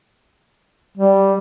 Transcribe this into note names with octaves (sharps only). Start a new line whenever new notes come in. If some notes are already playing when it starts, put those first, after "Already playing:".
G3